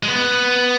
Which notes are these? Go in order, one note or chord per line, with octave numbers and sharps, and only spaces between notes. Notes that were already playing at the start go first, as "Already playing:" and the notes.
G#3
B3